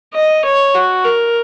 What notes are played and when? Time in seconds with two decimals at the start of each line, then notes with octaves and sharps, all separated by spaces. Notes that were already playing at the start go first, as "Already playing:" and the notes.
0.14 D#5
0.45 C#5
0.75 F#4
1.05 A#4